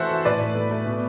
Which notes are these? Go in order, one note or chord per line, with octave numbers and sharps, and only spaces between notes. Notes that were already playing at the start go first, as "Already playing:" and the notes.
Already playing: E3 F#4 A4 C5 E5
E3
A2 B4 D5
A2
A3
A3
B2